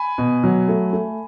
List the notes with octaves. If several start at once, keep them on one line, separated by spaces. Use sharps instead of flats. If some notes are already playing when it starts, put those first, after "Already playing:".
Already playing: G#5 B5
B2
F#3
A3
A3